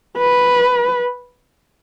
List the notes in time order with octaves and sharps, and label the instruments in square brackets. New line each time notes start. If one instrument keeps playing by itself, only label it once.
[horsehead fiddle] B4